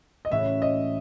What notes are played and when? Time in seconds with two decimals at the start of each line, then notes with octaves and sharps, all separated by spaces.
0.25 D#5
0.30 A2 E3 A3 C#4 F#4 E5
0.62 D#5